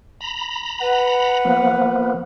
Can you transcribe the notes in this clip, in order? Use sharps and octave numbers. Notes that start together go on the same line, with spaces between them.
A#5 B5
B4 F#5
F3 A#3 B3